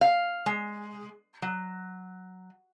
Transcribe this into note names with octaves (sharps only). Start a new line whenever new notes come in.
F5
G#3
F#3